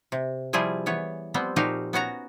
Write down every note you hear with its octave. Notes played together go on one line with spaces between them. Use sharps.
C3
F3 G3 E4 F4 G#4
E3 B3 C#5
F3 G3 B3 C4
A#2 F3 D#4 F#4 G4 F5
B3 C#4 F#4 A#5